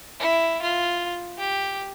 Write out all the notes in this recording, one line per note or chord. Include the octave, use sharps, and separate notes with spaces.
E4
F4
G4